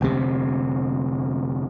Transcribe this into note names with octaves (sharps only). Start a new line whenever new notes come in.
F1 D2 C3